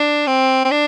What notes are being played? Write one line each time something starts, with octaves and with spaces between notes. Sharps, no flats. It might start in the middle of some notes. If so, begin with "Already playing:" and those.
Already playing: D4
C4
C4
D4